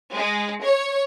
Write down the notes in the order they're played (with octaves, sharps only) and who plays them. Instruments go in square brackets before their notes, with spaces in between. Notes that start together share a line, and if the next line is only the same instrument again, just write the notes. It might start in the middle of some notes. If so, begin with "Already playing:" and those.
[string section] G#3
C#5